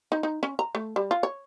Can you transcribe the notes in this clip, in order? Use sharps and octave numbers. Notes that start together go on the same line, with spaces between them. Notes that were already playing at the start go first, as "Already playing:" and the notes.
D#4
D#4
C#4
A#5
A3
G3
F4
C#5